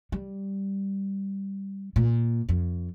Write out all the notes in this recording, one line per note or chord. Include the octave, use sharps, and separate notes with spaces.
G3
A#2
F2